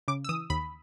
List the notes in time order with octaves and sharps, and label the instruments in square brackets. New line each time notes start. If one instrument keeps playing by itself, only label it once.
[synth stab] C#3 D6
E6
E3 D#6
D#2 B5